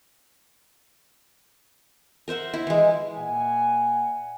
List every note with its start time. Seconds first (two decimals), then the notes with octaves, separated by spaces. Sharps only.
2.28 A#4 C5 E5 F#5
2.54 E4
2.67 E3 G#3
3.17 A#2 D5 E5 F#5 G#5